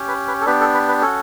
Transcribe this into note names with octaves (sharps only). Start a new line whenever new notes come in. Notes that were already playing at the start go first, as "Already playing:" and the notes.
Already playing: C#4 G4
B4
B4
A4
B3 D4 G4 B4
A4
B4
B4
C#4 F#4 A4